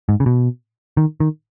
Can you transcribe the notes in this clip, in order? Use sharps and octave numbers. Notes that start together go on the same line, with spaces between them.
G#2
C#3
B2
D#3
D#3